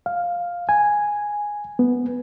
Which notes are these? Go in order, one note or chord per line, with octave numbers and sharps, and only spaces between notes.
F5
G#5
B3